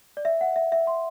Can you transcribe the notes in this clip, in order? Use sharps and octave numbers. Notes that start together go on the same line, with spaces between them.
D5
E5
F#5
E5
E5
C6